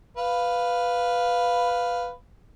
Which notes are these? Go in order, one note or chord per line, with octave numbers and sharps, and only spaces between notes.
B4 F5